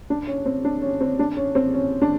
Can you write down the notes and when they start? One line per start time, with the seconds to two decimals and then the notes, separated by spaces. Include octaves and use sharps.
0.10 D4
0.27 C#4
0.46 C4
0.65 D4
0.82 C#4
1.01 C4
1.19 D4
1.37 C#4
1.55 C4
1.74 C#4
2.02 D4